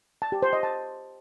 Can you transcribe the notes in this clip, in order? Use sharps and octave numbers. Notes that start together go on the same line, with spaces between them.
A5
G4
C5
D#5
A5